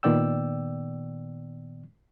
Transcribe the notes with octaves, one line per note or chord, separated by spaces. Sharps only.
A#2 D#3 B3 D5 G5 E6